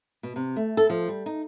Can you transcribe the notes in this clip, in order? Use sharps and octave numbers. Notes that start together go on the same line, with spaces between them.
B2
C3
A3
A4
F3
G3
D#4